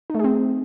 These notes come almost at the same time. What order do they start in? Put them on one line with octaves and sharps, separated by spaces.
D#4 A3 G#4 C4